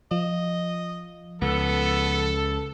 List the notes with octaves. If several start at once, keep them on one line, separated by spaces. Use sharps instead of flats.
F3 D#5
C#2 B3 A4